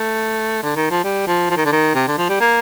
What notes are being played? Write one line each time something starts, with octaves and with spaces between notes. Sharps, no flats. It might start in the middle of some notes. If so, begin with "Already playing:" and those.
Already playing: A3
D3
D#3
F3
G3
F3
F3
D#3
D3
D#3
C3
D3
F3
G3
A#3